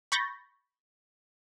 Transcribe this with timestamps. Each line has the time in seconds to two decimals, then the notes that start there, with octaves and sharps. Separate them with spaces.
0.12 B5 C#6 G6 A6 A#6